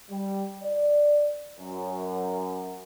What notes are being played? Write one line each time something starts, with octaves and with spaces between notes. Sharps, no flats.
G3
D5
F#2